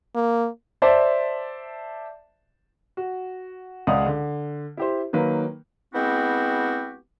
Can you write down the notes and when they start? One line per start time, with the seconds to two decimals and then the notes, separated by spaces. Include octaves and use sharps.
0.15 A#3
0.82 C5 D5 E5 A5
2.97 F#4
3.87 C#2 G#3 D5 F5 F#5 D#6
4.06 D3
4.77 E4 G4 C5
5.13 D#3 F#3 A#3 B4
5.95 G#3 B3 C4 E4 F#4 G4